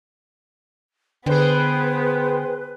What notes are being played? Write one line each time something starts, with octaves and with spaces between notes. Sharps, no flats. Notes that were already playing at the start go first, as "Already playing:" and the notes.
D3 B3 G#4 B4 C5 G5